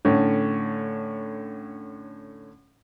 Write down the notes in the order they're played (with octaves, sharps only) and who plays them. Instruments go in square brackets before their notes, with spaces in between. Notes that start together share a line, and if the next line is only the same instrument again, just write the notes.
[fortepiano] A2 D3 C#4